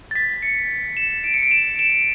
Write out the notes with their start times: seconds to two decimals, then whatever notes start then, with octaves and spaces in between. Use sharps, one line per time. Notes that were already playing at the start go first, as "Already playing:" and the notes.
0.11 A6
0.16 B6
0.42 C#7
0.97 E7
1.24 D7
1.34 C#7
1.43 D7
1.51 E7
1.79 E7